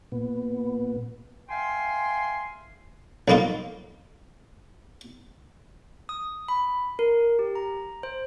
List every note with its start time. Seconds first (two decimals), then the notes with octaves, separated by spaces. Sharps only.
0.12 A#2 B3
1.49 E5 F5 G5 G#5 C6
3.28 B1 F2 A#3 D#4 F4
6.09 D#6
6.48 B5
6.99 A#4
7.39 G4
7.55 A#5
8.03 C5